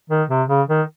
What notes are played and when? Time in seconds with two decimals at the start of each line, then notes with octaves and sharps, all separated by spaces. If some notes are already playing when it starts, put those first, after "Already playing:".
0.09 D#3
0.29 C3
0.48 C#3
0.68 D#3